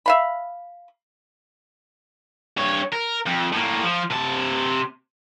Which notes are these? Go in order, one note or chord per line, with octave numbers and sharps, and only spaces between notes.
E5 F5 B5
G2 C#5
A#4
F2
A2 A#3
F3
C3 A5